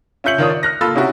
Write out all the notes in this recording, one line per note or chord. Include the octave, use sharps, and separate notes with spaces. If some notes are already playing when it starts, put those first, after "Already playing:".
C#4 F4 E5 G6 C#7 F#7
D#3 D4 F4 C#5 D#6
D5
F6 F#6 A#6
A#3 F4 A4 B5 E6 A6
C3 C#4 D#4 E4 F#4